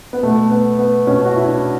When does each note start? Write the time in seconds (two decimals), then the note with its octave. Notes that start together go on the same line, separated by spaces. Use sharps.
0.13 B3
0.23 B2 A3
0.51 B3
0.79 B3
1.07 B2 C#4
1.25 F#4
1.36 E4
1.48 D4